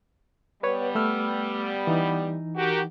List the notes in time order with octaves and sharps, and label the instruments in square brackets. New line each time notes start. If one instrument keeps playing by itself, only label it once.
[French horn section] G3 B3 [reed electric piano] B4 C#5
[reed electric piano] A3 E6 F6
E3 D#4
[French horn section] F#4 G4 A#4